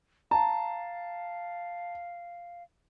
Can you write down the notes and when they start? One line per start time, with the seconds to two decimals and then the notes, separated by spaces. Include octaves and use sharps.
0.31 F5 A5 A#5